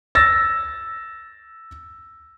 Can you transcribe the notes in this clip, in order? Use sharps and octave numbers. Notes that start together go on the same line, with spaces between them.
E6 A6 A#6